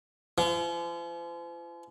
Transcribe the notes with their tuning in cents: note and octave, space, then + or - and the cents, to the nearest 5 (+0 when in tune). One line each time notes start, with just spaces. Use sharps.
F3 -40